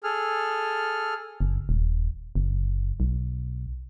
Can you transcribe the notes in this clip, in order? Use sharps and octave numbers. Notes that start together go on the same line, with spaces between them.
G#4 A4 F6
F#1
D#1
F#1
B1